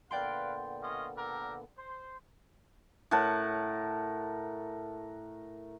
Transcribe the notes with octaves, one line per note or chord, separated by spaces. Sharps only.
A#2 D3 B3 B4 D5 F5 G5 C6
C#4 F4 D#5
G4 A4 A#4
C5
A2 A#4 F#5 A5